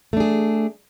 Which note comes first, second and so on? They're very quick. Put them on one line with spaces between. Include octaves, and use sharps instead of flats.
A3 D4 G#4